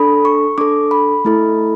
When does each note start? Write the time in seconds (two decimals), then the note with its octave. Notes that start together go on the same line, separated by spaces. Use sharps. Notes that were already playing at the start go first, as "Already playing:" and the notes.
Already playing: D4 A4 B5
0.25 C#6
0.58 D4 A4 D6
0.91 B5
1.25 A3 E4 A4